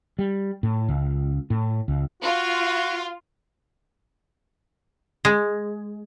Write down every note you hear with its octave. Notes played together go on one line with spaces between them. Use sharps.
G3
A2
C#2
A2
C#2
F4 F#4
G#3